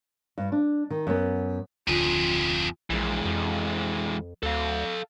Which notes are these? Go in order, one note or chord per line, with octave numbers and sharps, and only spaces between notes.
G2
D4
D#3
F#2 B3
D1 F2 D3 F4 G#4
A#1 E3 G#3
F2
D2 A4 F5